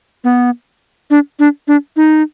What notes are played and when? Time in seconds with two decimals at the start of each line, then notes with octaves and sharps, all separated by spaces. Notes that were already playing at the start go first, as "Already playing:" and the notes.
0.24 B3
1.10 D4
1.39 D4
1.68 D4
1.96 D#4